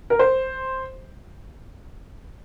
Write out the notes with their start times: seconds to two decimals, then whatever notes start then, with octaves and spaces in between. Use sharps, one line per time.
0.10 A#4
0.19 C5